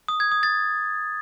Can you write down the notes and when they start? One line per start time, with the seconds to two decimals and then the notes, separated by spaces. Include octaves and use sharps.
0.08 D#6
0.20 G#6
0.32 D#6
0.43 A6